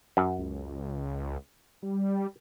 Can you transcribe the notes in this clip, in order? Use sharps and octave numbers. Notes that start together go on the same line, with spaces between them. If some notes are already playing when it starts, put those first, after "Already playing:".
F#2
C#2
G3